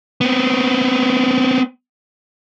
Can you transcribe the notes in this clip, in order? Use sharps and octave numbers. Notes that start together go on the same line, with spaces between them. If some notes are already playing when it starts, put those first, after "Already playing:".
B3 C4